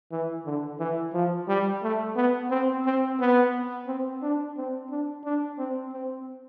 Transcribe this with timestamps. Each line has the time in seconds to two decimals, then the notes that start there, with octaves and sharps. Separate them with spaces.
0.12 E3
0.45 D3
0.79 E3
1.14 F3
1.48 G3
1.83 A3
2.16 B3
2.50 C4
2.86 C4
3.20 B3
3.87 C4
4.22 D4
4.57 C4
4.90 D4
5.24 D4
5.58 C4
5.93 C4